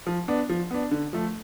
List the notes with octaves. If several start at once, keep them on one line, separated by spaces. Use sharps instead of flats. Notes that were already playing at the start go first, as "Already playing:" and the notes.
F3
B3 D4
F3
B3 D4
D3
F3 A3